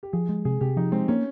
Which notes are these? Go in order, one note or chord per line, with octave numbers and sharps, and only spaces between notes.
G4
F3 G#4
G#3
C3 G#4
C3 G4
F3 D#4
G#3 C4
A#3 C#4